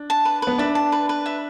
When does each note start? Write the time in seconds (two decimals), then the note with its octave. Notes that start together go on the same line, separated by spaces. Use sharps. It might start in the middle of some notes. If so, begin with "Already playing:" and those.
Already playing: D4
0.10 A5
0.25 B4
0.42 B3 B4
0.58 D4 E5
0.75 A5
0.92 B4
1.09 B4
1.26 E5